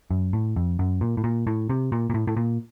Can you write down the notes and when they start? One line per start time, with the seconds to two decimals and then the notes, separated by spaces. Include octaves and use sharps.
0.11 F#2
0.33 A2
0.56 F2
0.79 F#2
1.01 A#2
1.17 A2
1.24 A#2
1.47 A2
1.69 C3
1.92 A#2
2.10 A#2
2.14 A2
2.27 A2
2.37 A#2